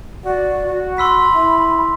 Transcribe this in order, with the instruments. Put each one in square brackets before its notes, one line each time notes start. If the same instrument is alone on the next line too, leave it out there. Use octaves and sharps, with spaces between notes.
[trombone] F#4 [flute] D5
[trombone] F#4
[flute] B5 [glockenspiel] C6 E6 B6
[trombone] E4